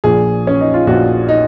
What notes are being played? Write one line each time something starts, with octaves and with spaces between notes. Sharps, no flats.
A#1 A#2 F3 G#4
C#4
D#4
F4
A#1 A#2 F3 F#4
D#4